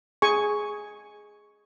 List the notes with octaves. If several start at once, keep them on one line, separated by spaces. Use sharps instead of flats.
G#4 G#5 C#6